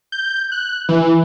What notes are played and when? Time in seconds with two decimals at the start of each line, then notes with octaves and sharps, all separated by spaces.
0.12 G6
0.52 F#6
0.89 E3